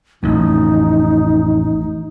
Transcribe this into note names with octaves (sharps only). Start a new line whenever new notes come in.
A1 F2 D#4